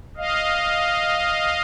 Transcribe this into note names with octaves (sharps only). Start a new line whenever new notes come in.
D#5 F5